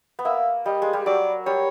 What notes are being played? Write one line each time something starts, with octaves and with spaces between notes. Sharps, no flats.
B3
A#3 E5
G3 D#5
G#3
G3
F#3 D5
G3 C#5